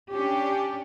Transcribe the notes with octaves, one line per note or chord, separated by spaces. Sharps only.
C#4 D4 G4